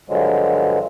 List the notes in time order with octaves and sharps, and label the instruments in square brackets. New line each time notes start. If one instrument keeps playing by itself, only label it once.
[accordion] G2 D3 F3 F#3 G#3